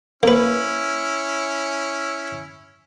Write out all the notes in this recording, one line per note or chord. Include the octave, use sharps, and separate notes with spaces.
A#3 C#4 E4 B4